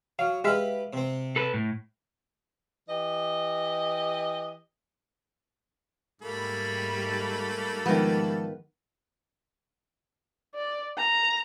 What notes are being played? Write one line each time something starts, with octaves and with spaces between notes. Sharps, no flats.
F#3 F5
G#3 G4 B4 E5 F5
C3 C4
A4 B4
A2
E3 G4 D#5
G#2 G3 A3 A#3 A4 B5
D#3 F3 G#3 B3 F5
D5
A#5